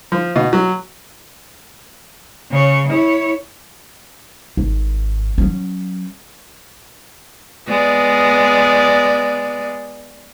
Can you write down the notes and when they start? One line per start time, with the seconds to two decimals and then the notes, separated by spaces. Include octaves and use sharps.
0.12 F3
0.36 B2
0.53 F#3
2.51 C#3 C#5
2.88 E4 C#5
4.57 G#1
5.38 F#3 C#4
7.68 G#3 B3 D5